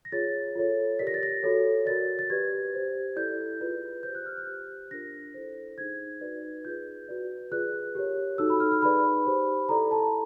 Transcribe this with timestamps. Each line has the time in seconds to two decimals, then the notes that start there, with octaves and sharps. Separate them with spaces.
0.05 A#6
0.12 F4 G#4 C#5 A6
0.55 F4 A4 C#5
0.99 G4 A#4 D5 B6
1.07 A#6
1.14 A6
1.23 A#6
1.43 F#4 A4 C#5
1.86 F#4 A#4 D5 A6
2.19 A6
2.30 G4 B4 D5 G#6
2.74 G4 C5
3.16 E4 A4 D5 G6
3.61 F4 G#4 B4 D5
4.03 G4 C5 G6
4.15 F#6
4.26 F6
4.37 F#6
4.47 G4 C5
4.91 D4 F4 A#4 A#6
5.34 E4 A4 C5
5.78 D#4 G#4 C5 G#6
6.21 D#4 F#4 B4 D5
6.64 F4 G#4 B4 G6
7.08 F#4 B4 D5
7.52 F4 G#4 B4 D5 F#6
7.95 G4 A#4 C#5
8.38 D#4 F#4 A4 E6
8.50 B5
8.60 F6
8.71 F6
8.82 D#4 G#4 B4 D5 B5
9.26 G4 C5
9.69 E4 A4 D5 A#5
9.91 A5